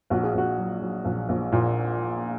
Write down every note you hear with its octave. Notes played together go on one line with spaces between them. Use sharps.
A#1 F#4
G#4
A#1 F#4
F#3
F#3
A#1
A#1
A#2